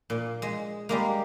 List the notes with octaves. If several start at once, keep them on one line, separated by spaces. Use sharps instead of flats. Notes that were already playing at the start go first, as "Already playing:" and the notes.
A#2
G#3
G3 G#3 A#3